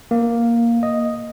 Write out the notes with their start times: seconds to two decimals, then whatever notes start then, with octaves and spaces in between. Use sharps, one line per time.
0.11 A#3
0.83 D#5